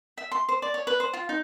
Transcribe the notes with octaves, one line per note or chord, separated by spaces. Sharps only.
E5
C6
C5
D5
C#5
B4
C5
F4
D#4